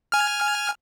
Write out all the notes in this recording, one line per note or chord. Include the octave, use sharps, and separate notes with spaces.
G#5 F6